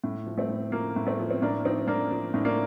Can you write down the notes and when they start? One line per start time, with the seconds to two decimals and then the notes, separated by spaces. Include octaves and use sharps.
0.04 A2
0.27 F3
0.38 A3 C4
0.49 A2
0.72 F3 A#3
0.96 A2
1.07 A3 C4
1.19 F3
1.31 C4
1.42 A2 A#3 D4
1.65 F3 C4 D#4
1.87 A2 A#3 D4
2.11 F3
2.34 A2 D#4
2.45 A#3 D4